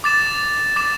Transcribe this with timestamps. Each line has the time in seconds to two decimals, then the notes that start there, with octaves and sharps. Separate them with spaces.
0.04 D6 A6 E7
0.76 D6 A6 E7